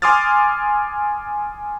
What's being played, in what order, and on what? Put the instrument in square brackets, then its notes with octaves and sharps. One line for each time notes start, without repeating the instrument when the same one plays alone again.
[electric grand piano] G#5 C6 D6 D#6 F6 A6